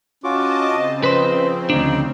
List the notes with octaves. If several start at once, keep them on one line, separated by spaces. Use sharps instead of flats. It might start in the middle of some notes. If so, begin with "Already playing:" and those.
C#4 F4 F#4 D#5 A5 D6
C#3 C4 D#5
F3 B4 C5 D#5
D2 D4 D#4